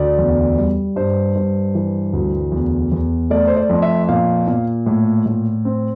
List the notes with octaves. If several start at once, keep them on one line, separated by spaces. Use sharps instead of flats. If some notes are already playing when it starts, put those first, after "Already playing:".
Already playing: D2 D5
E2
G3
G2 C5
G2
E3
D2
E2
E2
A3 D5
C5
D5
F2
E5
A#2 F5
A#2
A2
A2
C4